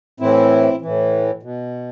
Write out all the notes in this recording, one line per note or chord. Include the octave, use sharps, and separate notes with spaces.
A2 E3 C4 E4
A2 E3
B2